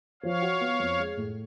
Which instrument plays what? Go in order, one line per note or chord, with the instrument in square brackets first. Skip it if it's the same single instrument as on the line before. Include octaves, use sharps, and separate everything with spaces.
[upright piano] F3 [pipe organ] C#5 F5
[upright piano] F#4
B3
F2
G#3
A2